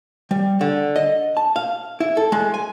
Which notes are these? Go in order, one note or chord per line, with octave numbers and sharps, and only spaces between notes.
G3
D3
D#5
A5
F5
E4
A4
G#3
G#5